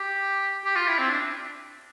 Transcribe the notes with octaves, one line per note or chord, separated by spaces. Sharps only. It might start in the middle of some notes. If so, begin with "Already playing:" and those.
Already playing: G4
G4
F4
E4
C4
D4